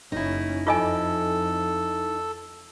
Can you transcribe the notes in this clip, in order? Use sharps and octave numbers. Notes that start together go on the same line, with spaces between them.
F#1 C#4 D#4 E4
F2 F4 A4 D#5 G#5